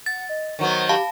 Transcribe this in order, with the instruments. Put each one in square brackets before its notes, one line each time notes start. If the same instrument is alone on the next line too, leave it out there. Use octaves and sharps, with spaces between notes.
[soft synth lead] F#5 [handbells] A6
[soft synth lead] D#5
[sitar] D#3 F#3 B3 [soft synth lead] C5
[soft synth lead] G4 [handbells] F5 A5 B5